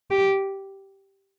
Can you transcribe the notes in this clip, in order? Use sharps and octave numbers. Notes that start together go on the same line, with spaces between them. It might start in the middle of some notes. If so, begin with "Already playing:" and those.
G4